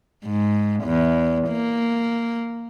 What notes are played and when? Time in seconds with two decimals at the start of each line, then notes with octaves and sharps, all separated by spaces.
0.25 G#2
0.84 E2
1.49 A#3